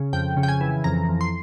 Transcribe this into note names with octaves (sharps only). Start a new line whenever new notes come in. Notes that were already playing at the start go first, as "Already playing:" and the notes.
Already playing: C#3
F2 G5
C#3
G5
G#5
E3
F2 A#5
F2
C6